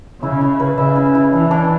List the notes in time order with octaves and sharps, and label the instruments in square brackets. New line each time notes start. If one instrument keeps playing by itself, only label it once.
[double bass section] C#3 [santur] E4
[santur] E4
B4
[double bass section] C#3 [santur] E5
[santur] E4
E4
[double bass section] E3 [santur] D4
[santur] D4